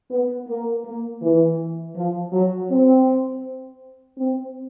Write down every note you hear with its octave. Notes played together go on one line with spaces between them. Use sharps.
B3
A#3
A#3
E3
F3
F#3
C4
C4